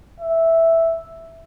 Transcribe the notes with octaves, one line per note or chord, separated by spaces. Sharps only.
E5